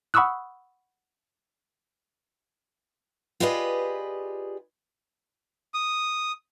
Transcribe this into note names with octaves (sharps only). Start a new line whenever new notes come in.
F#5 B5 C#6 D#6 E6 F#6
F4 G4 G#4 B4 D5 D#5
D#6